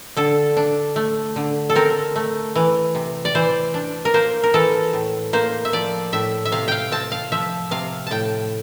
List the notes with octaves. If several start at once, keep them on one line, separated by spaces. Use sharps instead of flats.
D3 A4
D4
A3
D3
A4
C4 A#4
A3
E3
C3
D5
E3 C5
D4
A#4
A#3 C5
A#4
E3 A4
A2
A#3 C5
E5
F3 D5
A2 E5
E5
C3 F5
F5 G5
C4 A5
F5
F3 E5
C3 F5
A2 G5 A5